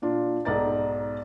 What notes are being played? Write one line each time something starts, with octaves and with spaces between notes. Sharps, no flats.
A#2 D4 F4
B1 G#2 D5 A#5 A6